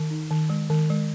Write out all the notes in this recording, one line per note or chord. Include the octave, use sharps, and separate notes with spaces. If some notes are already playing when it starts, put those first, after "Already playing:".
Already playing: D#3
D#4
D#3
G#3
D#3
G#3